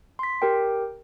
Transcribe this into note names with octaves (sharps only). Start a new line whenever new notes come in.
C6 B6
G4 A#4 G5